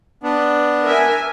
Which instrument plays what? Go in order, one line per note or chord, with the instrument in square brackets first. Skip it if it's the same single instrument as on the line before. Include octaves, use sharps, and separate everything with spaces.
[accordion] B3 D4
[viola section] A#4 E5 G#5